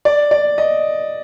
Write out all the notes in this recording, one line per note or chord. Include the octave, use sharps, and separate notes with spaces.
D5
D5
D#5